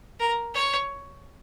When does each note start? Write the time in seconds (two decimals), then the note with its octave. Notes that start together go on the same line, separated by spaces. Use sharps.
0.20 A#4
0.54 C#5